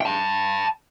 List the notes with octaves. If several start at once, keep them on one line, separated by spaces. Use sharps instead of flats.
G5 A5